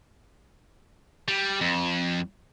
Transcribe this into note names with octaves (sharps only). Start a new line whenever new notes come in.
G3
F2